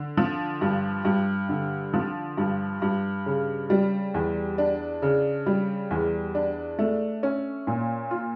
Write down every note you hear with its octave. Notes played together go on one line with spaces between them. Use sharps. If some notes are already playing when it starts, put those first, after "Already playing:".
Already playing: D3
F3
G2
G2
D3
F3
G2
G2
C#3
G3
E2
D4
C#3
G3
E2
D4
A3
C#4
A#2
F4